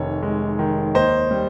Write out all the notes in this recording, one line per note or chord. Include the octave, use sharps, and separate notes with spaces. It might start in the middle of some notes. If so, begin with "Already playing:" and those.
Already playing: F1 D#3 C#5
G#3
D#3
D#2 C5 D#5
G3